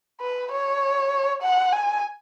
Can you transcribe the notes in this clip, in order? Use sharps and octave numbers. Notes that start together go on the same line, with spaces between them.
B4
C#5
F#5
G#5